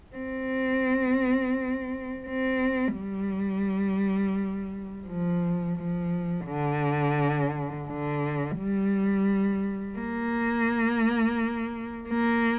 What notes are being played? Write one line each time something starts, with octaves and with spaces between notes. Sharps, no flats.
C4
C4
G3
F3
F3
D3
D3
G3
A#3
A#3